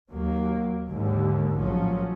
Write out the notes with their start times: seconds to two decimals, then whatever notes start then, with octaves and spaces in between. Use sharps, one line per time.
0.11 D#2 F#3 A#3
0.90 D#2 G#2 D3
1.57 A#1 A2 F3 F#3 C#4